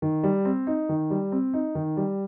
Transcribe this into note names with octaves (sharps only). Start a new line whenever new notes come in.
D#3
G3
C4
D#4
D#3
G3
C4
D#4
D#3
G3